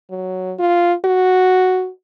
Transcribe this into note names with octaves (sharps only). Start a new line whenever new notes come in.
F#3
F4
F#4